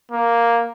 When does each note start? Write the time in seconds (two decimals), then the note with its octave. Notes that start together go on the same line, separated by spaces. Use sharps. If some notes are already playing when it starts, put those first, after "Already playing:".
0.12 A#3